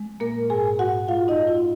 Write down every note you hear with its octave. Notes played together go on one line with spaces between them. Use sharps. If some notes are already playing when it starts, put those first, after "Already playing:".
Already playing: G#3
A#2 A#3 A#4
G#2 G#4 G#5
G#2 F#4 F#5
G#3 F4 F5
D#4 D#5
F#2
F4